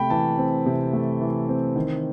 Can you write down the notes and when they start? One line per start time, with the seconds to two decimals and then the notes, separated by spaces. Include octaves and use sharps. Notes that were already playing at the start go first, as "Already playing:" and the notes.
Already playing: C3 A3 G5 B5
0.10 E3 A5
0.38 C4
0.66 C3
0.93 A3
1.21 E3
1.49 C4
1.76 D#3